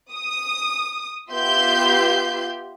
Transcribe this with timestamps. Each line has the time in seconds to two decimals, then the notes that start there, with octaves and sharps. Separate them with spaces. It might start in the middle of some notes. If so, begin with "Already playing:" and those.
0.13 D#6
1.31 B3 F4 G4 E5 C6 G6